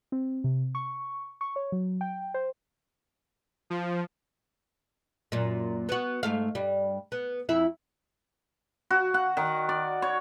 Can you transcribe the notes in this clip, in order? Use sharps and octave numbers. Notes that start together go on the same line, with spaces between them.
C4
C3
C#6
C#6
C#5
F#3
G5
C5
F3
F#2 A#2
B3 F#4
G#2 A3 F5
G2 G3
B3
F2 E4 E5
F#4
F#5
D#3
D5
C#5